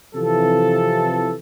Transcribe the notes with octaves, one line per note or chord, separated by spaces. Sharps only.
C3 E3 F3 A4